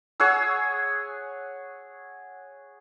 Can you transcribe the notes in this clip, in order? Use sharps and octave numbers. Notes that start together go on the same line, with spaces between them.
G#4 C#5 F#5 E6